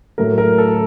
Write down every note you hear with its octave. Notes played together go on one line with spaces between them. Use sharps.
A2 F#3 A3 A#4
A#4
A4